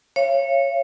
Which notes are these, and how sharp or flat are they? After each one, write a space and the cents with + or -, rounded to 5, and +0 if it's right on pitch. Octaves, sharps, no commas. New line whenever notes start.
C#5 -15 F5 -40